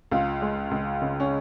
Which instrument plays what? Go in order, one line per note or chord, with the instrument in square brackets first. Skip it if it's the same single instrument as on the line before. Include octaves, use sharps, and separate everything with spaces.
[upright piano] C#2 F4
G#3
C#2
C#3
C#4